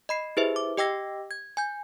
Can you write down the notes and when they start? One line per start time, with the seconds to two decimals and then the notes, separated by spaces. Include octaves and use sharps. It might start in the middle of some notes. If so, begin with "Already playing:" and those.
0.09 D#5 B5 C7
0.37 E4 G4 G#4 B4 C5 E5
0.56 D6
0.78 G4 D#5 G5 D6 E6 A#6
1.31 G#6
1.57 G#5 G6